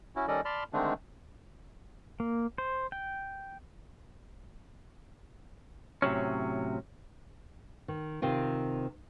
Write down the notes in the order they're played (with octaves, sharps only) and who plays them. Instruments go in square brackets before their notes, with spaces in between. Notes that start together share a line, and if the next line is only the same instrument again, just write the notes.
[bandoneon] C#4 E4 F#4
D#3 G3 C#4 A4 D5 D#5
D5 A5 B5 C6 F6
D3 D#3 G#3 A3 C4 D4
[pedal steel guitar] A#3
C5
G5
[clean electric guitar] A2 C3 F#3 C#4
[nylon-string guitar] D#3
C3 D#3 C4 F4